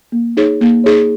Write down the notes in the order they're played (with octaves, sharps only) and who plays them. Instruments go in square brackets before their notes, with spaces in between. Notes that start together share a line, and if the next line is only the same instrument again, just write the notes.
[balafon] A#3
D#4 G#4 C#5
A#3
D#4 G#4 C#5